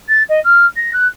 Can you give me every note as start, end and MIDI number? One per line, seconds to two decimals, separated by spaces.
0.08 0.23 93
0.29 0.40 75
0.44 0.65 89
0.76 0.91 94
0.93 1.07 90